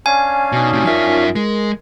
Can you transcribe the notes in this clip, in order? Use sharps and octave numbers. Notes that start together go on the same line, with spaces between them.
C#4 D4 F5 G#5
B2 D#4 F#4
A2 C3
F#2 D#4 F4 A#4 E5
G#3 A#4